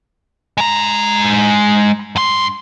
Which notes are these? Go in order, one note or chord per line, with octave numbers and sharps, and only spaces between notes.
G#3 A#5
G2 C6